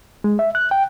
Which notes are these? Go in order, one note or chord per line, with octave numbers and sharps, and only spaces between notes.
G#3
E5
F#6
G5